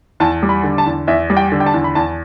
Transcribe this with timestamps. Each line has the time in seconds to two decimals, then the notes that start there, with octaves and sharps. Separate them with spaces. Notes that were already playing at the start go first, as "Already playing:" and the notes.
0.20 E2 A5
0.43 G3
0.49 B5
0.64 D3
0.78 A5
0.86 E2
1.07 E2 E5
1.30 G3
1.37 G5
1.52 D3
1.60 G5
1.66 A5
1.74 E2
1.84 B5
1.95 E2 A5